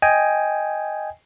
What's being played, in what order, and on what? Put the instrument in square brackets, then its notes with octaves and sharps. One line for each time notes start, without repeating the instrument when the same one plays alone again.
[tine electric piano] D#5 G5 G#5